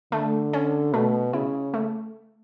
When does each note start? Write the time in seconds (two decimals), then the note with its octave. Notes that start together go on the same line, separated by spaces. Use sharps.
0.12 D3 A3
0.53 C#4
0.93 B2 A3
1.33 C#3 E4
1.74 A3